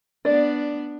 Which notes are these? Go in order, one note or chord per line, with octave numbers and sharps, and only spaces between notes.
B3 D4 D5